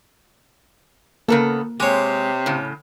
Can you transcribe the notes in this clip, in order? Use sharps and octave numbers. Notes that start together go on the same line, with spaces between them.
C#3 A#3 B3 A4 A#4
C3 G#3 G4 C#5
A2 C#3